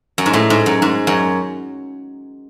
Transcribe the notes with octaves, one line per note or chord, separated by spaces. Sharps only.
F#2
G#2
A2
G#2
F#2
G#2
F#2